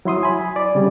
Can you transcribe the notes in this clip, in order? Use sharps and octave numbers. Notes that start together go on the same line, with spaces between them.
F#3 E4 C6 D#6
G#5 B5
D5
C#3 G3